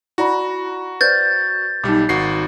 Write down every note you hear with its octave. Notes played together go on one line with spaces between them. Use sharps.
E4 F#4 D5 A#5 B5
B4 C5 D5 G6 A6
B1 G3 D#4 D6
G#1 F#4 C7